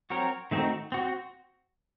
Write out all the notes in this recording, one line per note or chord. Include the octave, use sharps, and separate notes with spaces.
F#3 C4 F#4 A#4 C#5
D#3 A3 C4 D#4 F#4
C4 F#4